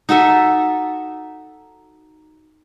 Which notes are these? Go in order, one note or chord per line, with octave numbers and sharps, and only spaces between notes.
D#4 F#4 A4 E5